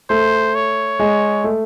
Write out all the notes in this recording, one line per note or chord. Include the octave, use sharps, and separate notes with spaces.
A3 C5
C#5
G#3
A3